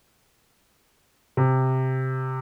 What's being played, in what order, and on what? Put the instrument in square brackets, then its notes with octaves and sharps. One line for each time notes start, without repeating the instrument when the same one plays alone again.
[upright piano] C3